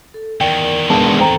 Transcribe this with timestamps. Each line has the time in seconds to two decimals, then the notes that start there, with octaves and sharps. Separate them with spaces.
0.14 A4
0.41 E2 D#3 A#4 D5 G5
0.90 G#3 B3 D4 A5
1.20 C4 A4 C5 G5 A#5